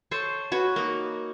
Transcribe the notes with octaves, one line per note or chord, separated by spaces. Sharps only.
A4 C5 C#5
F#4 B4 C#5
A#3 D#4